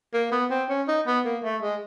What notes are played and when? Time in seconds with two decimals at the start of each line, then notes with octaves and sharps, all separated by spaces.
0.14 A#3
0.32 B3
0.50 C4
0.69 C#4
0.88 D#4
1.07 B3
1.25 A#3
1.44 A3
1.62 G#3